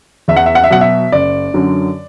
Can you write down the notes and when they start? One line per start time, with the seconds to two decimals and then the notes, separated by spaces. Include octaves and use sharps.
0.28 E2 E5
0.36 F#5
0.46 E5
0.55 F#5
0.64 E5
0.70 B2 F#3 F#5
0.81 E5
1.12 F#1 D5
1.54 F#2 D3 F#3